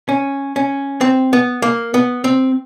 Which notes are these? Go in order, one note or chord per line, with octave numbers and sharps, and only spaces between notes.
C#4
C#4
C4
B3
A#3
B3
C4